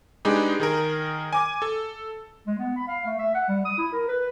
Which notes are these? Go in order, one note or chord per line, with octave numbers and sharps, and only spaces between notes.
G#3 D4 D#4 G4 G#4 B4
D#3 G#4 A#4
G#5 D6
A4
G#3
B3
B5
F5
A3
E5
F#5
G3
D#6
E4
A#4
B4